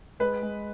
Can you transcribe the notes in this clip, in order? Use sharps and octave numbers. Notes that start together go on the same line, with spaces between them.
G#3 B4
G#3